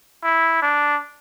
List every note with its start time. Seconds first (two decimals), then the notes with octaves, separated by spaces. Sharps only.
0.24 E4
0.62 D4